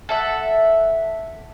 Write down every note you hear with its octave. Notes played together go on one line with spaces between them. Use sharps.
A4 E5 F#5